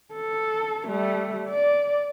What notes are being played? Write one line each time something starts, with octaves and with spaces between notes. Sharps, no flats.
A4
G3 A3
D5